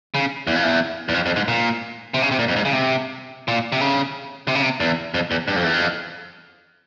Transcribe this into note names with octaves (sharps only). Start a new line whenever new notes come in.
C#3
E2
F2
E2
E2
F2
F2
G#2
A#2
C3
C#3
C3
A#2
F2
G#2
C#3
C3
A#2
C3
C#3
C3
C#3
C3
E2
F2
E2
G2
F2
E2
F2